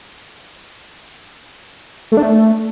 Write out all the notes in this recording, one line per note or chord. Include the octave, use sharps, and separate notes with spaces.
A3
D4
A3